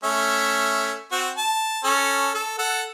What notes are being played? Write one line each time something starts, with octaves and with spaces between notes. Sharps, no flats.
A3 C#4 E5
C4 F#4
A5
C#4 A4
A4
A4 F#5